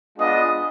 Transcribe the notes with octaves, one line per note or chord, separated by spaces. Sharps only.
G#3 B3 D4 F4 D#5